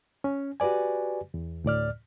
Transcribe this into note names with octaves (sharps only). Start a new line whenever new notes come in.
C#4
F#4 G4 B4 D5 G#5
E2
D2 A2 D5 F6